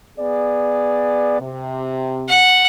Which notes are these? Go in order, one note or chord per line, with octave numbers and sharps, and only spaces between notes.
B3 G#4 D5
C3
F#5